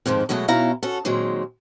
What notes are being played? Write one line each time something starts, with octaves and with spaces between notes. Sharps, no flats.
F2 G#2 D#3 F3
B2 F#3 G#3 A3 D#5
B2 C#4 D#4 E4 F5 A#5
C#4 F#4 A4
A#2 D#3 F#3 G#3 C4